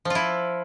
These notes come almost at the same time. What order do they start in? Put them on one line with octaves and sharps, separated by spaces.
F3 F4 E4